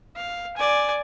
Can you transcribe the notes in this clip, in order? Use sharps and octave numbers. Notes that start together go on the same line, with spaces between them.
F5
D5 G#5